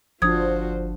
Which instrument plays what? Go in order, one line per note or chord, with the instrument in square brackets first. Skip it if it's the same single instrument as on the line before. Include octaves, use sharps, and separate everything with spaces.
[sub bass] G1 [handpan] F3 D4 [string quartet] F4 F#4 C5 [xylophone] D#6 G#6